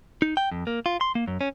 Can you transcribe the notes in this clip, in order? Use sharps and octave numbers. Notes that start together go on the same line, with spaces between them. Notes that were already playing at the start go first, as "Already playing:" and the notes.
D#4
G5
F2
A#3
F4
C6
A#3
F#2
C#4